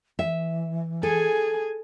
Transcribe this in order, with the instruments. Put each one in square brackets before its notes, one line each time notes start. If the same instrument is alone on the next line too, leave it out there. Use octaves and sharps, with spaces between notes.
[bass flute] E3 [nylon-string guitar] E5
[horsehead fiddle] G#4 G#5 [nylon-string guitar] A4